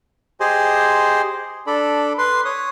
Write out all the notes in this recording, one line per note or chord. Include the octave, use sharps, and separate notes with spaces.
G4 G#4 C5 D#5 G#5 C6
D4 A4 D5 B5
B4 C6
C#5 D#6